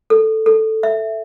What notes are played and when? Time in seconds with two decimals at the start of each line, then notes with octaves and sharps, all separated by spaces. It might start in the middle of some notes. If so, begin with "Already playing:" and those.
0.10 A4
0.46 A4
0.83 E5